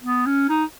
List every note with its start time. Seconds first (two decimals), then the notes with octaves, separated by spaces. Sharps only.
0.02 B3
0.26 C#4
0.49 D#4